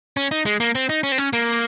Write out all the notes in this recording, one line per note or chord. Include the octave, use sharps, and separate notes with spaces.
C#4
D#4
G#3
A#3
C4
D#4
C#4
C4
C#4
A#3